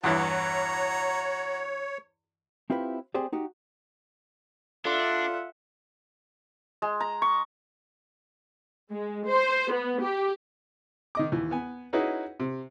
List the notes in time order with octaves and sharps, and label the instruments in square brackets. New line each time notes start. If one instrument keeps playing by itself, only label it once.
[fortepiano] E2 G2 E3 [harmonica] F#4 A#5 [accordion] C#5
[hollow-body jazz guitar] C4 E4 F4 G4 B4 C5
C4 G4 G#4 C5 D5
D#4 F#4 G4
[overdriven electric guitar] D4 [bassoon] F4 [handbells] A4 D5 C6 [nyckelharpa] E5 F#5
[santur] G#3
A#5
C#6
[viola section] G#3
C5
B3
G4
[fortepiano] D#3 D#5 D6
D#2 E3
B3 G#5
C#4 D#4 E4 F#4 G#4 B4
C3